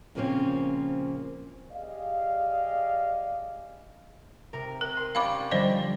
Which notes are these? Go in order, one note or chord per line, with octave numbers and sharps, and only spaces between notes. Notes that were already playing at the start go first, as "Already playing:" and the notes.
A#2 C#3 F3 A#3 C4 C#4
G4 G#4 D5 D#5 F5
C3 A#4
A#4
C6 D#7
C#4 G4 D5 F5 B5 D6
D3 F3 G3 C5 D5 D#5